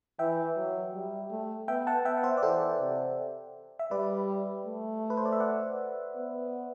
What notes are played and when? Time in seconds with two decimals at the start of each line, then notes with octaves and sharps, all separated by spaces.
0.19 E3 E5 G5
0.56 F#3
0.94 G3
1.30 A3
1.68 B3 E5 G5
1.87 F#5 A5
2.05 B3 E5 G5
2.17 F#5
2.23 C5 E5
2.37 D5
2.43 E3 A4 C5
2.79 C3
3.79 E5
3.91 G3 B4 D5
4.66 A3
5.10 B4
5.17 C5
5.25 D5
5.32 E5
5.40 D5 F#5
6.15 B3